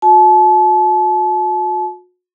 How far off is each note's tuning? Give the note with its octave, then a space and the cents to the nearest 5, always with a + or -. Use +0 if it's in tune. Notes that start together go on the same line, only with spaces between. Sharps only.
F#4 -40 A5 -35